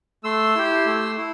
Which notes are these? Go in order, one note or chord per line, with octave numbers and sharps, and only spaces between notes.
A3 C6 E6
E4 G4
A3
E4